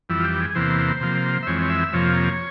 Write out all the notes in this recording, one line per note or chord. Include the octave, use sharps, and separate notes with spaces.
F2 E3 G3 E4
F4
G4
G#4
E2 C3 E3 A#3 C5
C3 F3 A#3
E5
F2 E3 G#3 C4 C#5
C#5
E5
F2 C3 F3 A#3 C#5